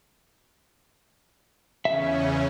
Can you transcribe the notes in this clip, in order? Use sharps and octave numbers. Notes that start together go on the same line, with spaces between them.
E2 C#3 C#4 E5